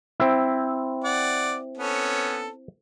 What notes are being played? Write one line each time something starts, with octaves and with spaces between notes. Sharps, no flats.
C4 E4
D5 F#5
B3 C#4 A4